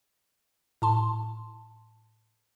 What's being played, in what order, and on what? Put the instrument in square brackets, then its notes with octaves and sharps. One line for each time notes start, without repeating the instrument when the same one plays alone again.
[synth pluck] A2 A5 C6